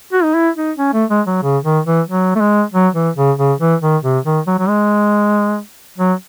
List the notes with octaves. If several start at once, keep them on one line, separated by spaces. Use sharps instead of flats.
F#4
D#4
E4
D#4
C#4
A3
G#3
F#3
C#3
D#3
E3
F#3
A3
G#3
F#3
E3
C#3
C#3
E3
D#3
C3
D#3
F#3
F#3
G#3
F#3